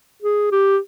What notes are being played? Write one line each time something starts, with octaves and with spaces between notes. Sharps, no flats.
G#4
G4